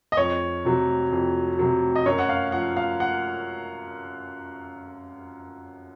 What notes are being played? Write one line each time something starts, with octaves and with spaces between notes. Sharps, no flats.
D#5
F2 C#5
C3 F#3
F2
C3 F#3
D#5
F#2 C#5
F#5
F5
F3 F#5
F5
F#5